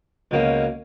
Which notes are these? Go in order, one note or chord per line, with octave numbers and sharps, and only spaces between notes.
C#2 B2 A#3 C#4